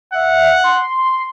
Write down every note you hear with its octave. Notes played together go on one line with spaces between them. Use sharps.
E5 F#5
C6